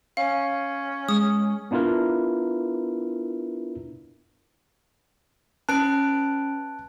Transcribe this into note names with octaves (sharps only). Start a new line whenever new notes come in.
C#4 F5
G#3 D#6
B3 D4 E4 F4 A#4 B4
C#4 B4 A5 F#6 D7